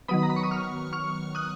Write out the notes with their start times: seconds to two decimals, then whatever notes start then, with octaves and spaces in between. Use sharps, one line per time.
0.08 D#3 F#3 B3 B5 D#6
0.23 A#5
0.30 B5
0.36 C#6
0.43 D#6
0.51 C#6 F6
0.93 C#6 F6
1.35 D#6 F#6